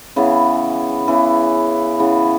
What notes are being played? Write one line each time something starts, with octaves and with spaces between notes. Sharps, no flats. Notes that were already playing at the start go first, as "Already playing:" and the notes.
C#3 E3 B3
C#3 E3 B3
C#3 E3 B3